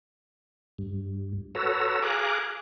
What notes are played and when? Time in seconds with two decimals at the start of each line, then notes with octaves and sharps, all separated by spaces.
0.78 G2
1.55 F#4 A4 B4 C#5 A#5 E6
2.02 G#4 F5 G#5 A#5 D6 F#6